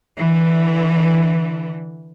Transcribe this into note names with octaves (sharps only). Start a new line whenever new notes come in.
D3 E3